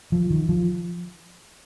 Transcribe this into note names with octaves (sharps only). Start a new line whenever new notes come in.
F3
D#3
F3